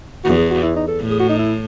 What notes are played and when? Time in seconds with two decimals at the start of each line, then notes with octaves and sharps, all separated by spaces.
0.24 E2 F#4
0.37 G#4
0.50 F#4
0.63 E4
0.76 D#4
0.88 A4
1.00 A2
1.10 G#4
1.19 F#4
1.29 D#4
1.39 E4